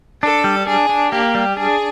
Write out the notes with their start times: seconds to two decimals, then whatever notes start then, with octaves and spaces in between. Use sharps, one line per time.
0.23 D4 A4
0.44 G3
0.67 D4 G#4
0.89 D4
1.11 A#3 G4
1.35 G3
1.56 D4 G#4